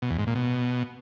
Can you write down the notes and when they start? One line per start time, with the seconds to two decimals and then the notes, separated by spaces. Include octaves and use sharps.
0.02 B2
0.10 E2
0.19 G#2
0.27 A#2
0.35 B2